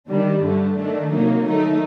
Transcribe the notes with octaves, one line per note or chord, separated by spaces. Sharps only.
D#3 G3 D4
G2 D3 A3
D#3 A3 D4
C3 F#3 A#3 D#4
D#3 A3 D#4